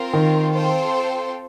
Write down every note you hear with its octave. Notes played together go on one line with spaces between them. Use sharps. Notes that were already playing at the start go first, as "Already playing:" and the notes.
Already playing: C4 F4 A#4
D#3
C4 F4 A4 C5 G5